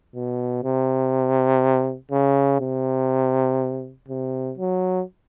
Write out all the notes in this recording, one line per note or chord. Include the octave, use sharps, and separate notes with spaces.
B2
C3
C#3
C3
C3
F#3